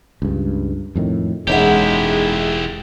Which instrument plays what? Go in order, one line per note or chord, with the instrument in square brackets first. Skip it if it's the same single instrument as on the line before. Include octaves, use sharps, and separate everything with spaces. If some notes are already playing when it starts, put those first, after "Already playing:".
[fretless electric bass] C#2 G2
F2 A2 D#3
[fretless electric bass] E1 [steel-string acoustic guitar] F#2 D#4 F#5 [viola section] G#3 [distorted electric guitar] E4 G4